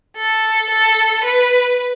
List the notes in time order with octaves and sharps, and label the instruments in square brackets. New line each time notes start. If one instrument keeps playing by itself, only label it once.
[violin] A4
A4
B4